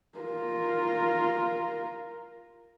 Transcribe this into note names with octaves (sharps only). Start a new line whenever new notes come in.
F4 A#4